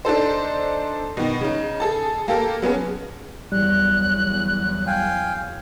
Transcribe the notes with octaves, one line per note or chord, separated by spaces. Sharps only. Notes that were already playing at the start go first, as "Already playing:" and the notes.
D4 D#4 A4 C5
B2 D#3
C#3 D#4
G#4 A4 A5
A#3 G4 A4 A#4
F#3 B3 C#4 G#4
E2 F#3 G3 F#6
F5 G5 G#5